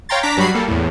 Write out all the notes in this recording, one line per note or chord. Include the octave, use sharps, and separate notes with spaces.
C#5 F5 G5 A#5 C6 A6
D4 A#5 D6 B6
G2 F#3 G3 F#4 B5 C7
G3 A#3 A4
E2 A2